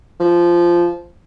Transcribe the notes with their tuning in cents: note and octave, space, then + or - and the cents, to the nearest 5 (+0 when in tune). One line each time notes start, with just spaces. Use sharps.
F3 -10